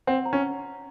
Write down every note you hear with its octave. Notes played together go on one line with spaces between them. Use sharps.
C4 F#5
A#5
C#4